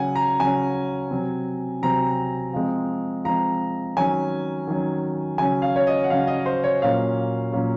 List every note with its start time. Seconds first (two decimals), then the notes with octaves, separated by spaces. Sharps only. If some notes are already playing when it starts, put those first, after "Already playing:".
Already playing: C#3 F#3 C#4 F#5 G#5
0.16 A#5
0.40 C#3 F#3 C#4 G#5
1.11 C3 F#3 C4
1.82 C3 F#3 C4 A#5
2.53 F3 G#3 C4
3.25 F3 G#3 C4 A#5
3.97 D#3 F#3 C#4 G#5
4.68 D#3 F#3 C#4
5.38 C#3 F#3 C#4 G#5
5.62 F5
5.76 C#5
5.87 D#5
6.04 F#5
6.10 C#3 F#3 C#4 F5
6.27 D#5
6.46 C5
6.64 C#5
6.82 A#2 F#3 A#3 C#4 F5
7.53 A#2 F#3 A#3 C#4